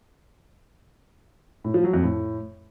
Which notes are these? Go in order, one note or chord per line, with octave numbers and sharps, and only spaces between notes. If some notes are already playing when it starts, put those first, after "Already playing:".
A2
F3
F#3
F2
A2